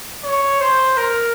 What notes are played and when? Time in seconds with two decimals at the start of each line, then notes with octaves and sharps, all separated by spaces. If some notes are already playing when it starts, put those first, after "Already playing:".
0.24 C#5
0.60 C5
0.97 A#4